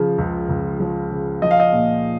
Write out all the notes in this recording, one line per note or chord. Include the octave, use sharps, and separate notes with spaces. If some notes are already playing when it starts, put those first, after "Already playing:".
Already playing: C#3 F3
C#2
C#2
F3
C#3
F3 D#5
F5
D#5
A#2